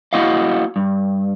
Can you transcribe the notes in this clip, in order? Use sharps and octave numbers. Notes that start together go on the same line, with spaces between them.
A#3 E4 F#4 D#5 F5
G2